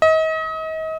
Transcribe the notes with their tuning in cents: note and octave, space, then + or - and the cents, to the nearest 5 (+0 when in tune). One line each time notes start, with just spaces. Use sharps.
D#5 +35